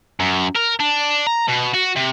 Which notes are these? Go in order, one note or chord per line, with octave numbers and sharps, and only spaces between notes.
F#2
A#4
D4
A#5
B2
F#4
C3